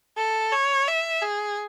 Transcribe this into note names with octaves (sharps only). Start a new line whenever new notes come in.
A4
C#5
E5
G#4